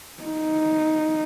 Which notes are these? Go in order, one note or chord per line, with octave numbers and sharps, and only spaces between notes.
D#4